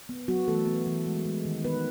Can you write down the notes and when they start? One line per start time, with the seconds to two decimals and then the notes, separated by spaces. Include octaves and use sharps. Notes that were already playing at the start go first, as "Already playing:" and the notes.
0.09 B3
0.28 F#3 B3 F#4
0.48 E3 A3 A4
0.66 B3
0.87 E3
1.06 G#3
1.25 G#3
1.45 D#3
1.64 D#3 B3 B4